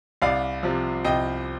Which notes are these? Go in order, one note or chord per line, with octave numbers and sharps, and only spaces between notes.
C2 D5 F5
C3 F3
C2 D#5 G5